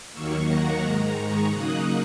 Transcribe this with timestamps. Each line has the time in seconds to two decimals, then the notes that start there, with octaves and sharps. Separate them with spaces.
0.13 D#2 D#3 F#3 A#3 C#6 E6
0.47 F#5 A#5
0.82 G#2 D#3 G#3 F#5 A#5
1.16 A#5 C#6
1.50 C#3 F#3 A#3 D#4 D#6 F#6